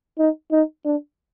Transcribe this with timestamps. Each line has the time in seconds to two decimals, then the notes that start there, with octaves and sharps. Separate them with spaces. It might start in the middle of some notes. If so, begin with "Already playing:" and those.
0.19 D#4
0.52 D#4
0.85 D4